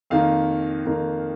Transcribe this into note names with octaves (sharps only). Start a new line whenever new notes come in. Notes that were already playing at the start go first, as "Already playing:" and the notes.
F2 D#3 A#3 F5
F2 D#3 A#3